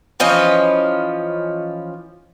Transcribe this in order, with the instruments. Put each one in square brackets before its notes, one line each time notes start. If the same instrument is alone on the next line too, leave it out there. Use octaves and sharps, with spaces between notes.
[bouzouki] E3 F3 C#4 D#5